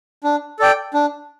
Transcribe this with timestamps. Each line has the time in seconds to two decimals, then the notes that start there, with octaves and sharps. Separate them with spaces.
0.24 D4
0.59 A4 D5 G5
0.94 D4